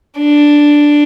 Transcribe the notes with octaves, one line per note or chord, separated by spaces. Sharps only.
D4